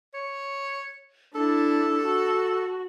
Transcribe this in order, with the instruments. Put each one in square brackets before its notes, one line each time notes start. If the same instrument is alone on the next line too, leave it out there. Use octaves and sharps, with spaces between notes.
[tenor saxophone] C#5
[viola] D4 E4 [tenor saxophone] A4
[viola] F#4